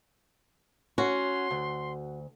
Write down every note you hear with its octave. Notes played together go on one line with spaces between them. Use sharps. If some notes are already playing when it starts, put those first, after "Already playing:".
C#4 F#4 C6
D2